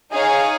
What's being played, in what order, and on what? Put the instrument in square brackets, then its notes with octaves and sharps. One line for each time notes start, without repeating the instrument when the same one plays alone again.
[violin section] D#4 G#4 C#5 F5 G#5